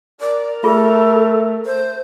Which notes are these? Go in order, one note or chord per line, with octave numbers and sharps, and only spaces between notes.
A#4 D5
A3 F4 G#4 A4
C5